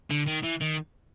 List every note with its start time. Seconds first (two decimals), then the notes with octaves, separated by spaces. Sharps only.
0.11 D3
0.27 D#3
0.43 E3
0.61 D#3